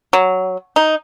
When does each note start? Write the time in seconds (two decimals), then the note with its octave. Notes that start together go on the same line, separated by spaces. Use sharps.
0.13 F#3
0.76 D#4